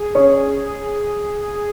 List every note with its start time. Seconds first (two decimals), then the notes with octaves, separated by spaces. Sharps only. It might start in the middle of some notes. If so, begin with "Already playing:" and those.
Already playing: G#4
0.15 C#4 C#5